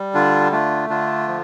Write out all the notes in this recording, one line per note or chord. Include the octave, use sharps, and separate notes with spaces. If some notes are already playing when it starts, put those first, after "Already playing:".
Already playing: G3
D3 D4 F4
A3 D4 F4
D3 D4 F4
F3